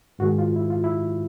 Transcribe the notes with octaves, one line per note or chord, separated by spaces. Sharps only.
G#2 D#3 G#3 F#4
F4
E4
F4
E4